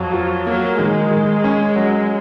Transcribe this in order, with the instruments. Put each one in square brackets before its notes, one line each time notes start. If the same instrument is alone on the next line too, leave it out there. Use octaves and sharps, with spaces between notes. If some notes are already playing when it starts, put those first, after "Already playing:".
Already playing: [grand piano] F2 [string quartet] F#3
[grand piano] F3
[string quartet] F#3 [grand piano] A#3
[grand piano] D#3 [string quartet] G#3
[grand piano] D#3
C#4
F#3